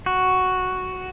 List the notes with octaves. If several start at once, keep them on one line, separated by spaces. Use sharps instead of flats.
F#4